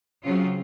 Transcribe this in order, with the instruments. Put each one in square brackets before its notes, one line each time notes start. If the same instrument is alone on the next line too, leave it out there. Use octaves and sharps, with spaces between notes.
[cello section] C#3 F#3 C4 C#4 F4